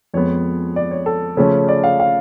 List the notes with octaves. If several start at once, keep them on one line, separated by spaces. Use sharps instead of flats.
F2 F3 G#3 B3 C#5
D5
C#5
A4
C#3 F3 A3 C#4
D5
F5
F5